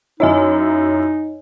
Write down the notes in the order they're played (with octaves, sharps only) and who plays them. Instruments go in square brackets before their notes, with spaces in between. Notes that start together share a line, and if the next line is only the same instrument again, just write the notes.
[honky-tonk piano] F#2 E4 [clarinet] D#4 [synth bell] C#5 D#5 G#5